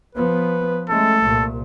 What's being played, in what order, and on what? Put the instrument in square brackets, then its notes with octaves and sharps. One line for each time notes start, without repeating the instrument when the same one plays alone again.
[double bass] F3 B3 [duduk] B4
[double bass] G#3 A3 [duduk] C#4 [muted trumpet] A4
[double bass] C2 A#2 [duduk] A3